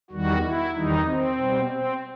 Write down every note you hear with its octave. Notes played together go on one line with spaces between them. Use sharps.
E2 D#3 G3 F#4
E4
E2 D#3 G3 D#4
C4
B2 G3
C4